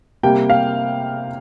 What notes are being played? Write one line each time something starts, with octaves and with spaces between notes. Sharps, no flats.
C3 G3 A#3 G5
F5